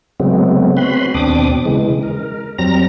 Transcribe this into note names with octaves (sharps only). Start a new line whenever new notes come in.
C#3 F#3 G#3 A3 B3 C4
C4 C#4 F#4 B4 B5 C6
D#2 B2 C4 D4 D6 D#6
C#3 E3 G#3
A#4
F2 F#3 G3 C4 A#5 A#6